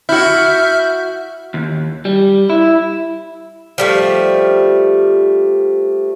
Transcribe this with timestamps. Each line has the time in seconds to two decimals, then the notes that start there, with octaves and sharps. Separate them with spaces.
0.09 E4 F#4 E5 F6 G6
1.54 D#2
2.05 G3
2.50 E4
3.78 F3 G3 A3